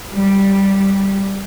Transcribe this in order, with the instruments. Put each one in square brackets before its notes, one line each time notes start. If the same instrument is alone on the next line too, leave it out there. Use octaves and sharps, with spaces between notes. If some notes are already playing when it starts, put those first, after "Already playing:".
[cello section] G3